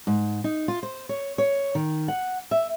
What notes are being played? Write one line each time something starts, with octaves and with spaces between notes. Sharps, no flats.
G#2
D#4
F4
C5
C#5
C#5
D#3
F#5
E5